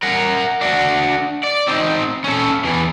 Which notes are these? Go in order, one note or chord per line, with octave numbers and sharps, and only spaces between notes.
A#4 F#5
D4 F#4
D5
C4 D#4
C#4 A4
E2 E3